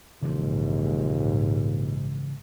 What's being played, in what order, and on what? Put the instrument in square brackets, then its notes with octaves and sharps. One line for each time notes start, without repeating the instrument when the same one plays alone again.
[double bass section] A#1 G#2 [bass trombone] D#2 [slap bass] C#3 E3 F3